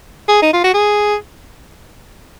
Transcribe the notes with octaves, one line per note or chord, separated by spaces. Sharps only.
G#4
D#4
F4
F#4
G#4